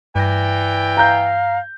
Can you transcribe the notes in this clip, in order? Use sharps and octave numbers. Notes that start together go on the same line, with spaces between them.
G2 E3 D5 G5 A#6
F5 A#5 G6